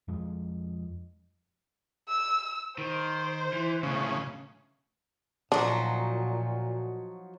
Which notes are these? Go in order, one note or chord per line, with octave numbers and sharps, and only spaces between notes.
F2 F3 G#3
E6
D#3 C5
E3
B1 A2 C#3
A#2 F3 F#3 D4 D#4